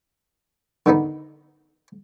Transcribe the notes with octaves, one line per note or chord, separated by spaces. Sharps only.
D3 D#3 B3 D#4